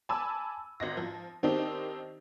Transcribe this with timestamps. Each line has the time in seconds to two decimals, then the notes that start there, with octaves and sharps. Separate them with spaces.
0.09 G#5 A5 B5 D6 E6
0.80 G#1 D#5 A#6
0.97 F3
1.43 D#3 C4 D4 D#4 G4